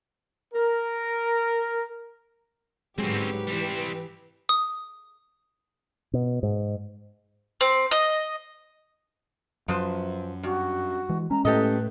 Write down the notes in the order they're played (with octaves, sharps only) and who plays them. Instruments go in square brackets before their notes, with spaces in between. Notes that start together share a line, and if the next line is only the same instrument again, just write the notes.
[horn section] A#4
[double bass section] G#2 D3 F#3 [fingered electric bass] G#3 [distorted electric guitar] C4 C#4 [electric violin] G4 B4
[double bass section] E3 [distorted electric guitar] G3 C4
[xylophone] D#6
[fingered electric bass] B2
G#2
[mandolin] C4
D#5
[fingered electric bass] F#2 [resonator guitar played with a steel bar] F3 B4 C5
[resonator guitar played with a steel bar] G2 [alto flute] F#4
[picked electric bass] E3 G#3
[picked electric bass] G#3 C#4 [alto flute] A#5
[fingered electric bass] A2 A3 [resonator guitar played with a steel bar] G4 A4 D#5 [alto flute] B4